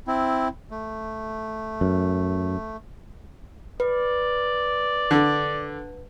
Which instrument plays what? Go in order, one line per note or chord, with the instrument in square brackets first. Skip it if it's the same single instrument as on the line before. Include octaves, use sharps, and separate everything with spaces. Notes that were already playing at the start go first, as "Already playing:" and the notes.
[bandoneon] C4 E4
A3
[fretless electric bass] F#2
[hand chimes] B4 [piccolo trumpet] D5
[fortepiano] D3